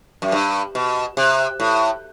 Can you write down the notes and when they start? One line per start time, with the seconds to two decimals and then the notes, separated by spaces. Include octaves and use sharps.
0.22 F#2
0.32 G2
0.75 B2
1.17 C3
1.60 A2